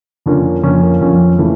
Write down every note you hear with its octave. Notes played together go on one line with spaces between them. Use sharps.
F2 D3 F3 A#3 C#4
F2 D3 F3 A#3 C#4
F2 D3 F3 A#3 C#4
C#3 E3 A3